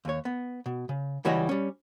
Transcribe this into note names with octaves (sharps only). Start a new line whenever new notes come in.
D#2 C#5
B3
B2
C#3
C#2 E3 G3 F#4 C#5 D#5
G3 C#4